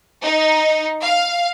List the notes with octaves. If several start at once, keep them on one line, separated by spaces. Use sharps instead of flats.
D#4
F5